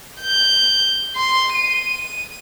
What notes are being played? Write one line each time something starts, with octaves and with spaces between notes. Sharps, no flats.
G6
C6
D#7